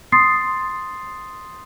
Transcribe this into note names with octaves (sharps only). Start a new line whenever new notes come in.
C6 D#6 A6 C7